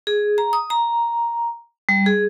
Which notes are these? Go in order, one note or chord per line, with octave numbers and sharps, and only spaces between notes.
G#4
A#5
D#6
A#5
G3
G#4